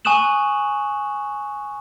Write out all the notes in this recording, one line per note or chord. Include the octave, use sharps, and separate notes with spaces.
G#5 C#6 D#6 F#6 E7 F#7